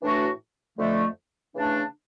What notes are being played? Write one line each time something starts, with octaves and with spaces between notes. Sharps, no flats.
A2 E3 A3 D4 F#4
F2 D3 F3 A3
C#3 E3 A3 D4